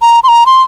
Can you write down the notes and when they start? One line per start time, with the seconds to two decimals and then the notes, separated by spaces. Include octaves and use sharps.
0.02 A#5
0.24 C6
0.28 A#5
0.46 C6